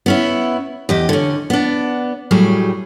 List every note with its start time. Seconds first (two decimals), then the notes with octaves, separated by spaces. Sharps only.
0.06 B3 C#4 E4
0.89 E2 G4 D#5
1.09 D3 C#4
1.50 B3 D4
2.31 A2 F#3 G3 G#4